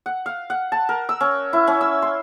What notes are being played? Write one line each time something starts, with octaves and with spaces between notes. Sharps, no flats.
F#5
F5
F#5
A5
A#4
E6
C#4
E4
C#4
E6
C6